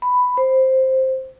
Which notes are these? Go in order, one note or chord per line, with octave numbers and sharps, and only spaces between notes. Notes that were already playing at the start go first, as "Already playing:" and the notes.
B5
C5